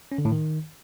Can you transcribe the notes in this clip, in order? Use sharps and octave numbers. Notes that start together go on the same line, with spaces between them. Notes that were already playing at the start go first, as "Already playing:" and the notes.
C#4
D3
A2
D#3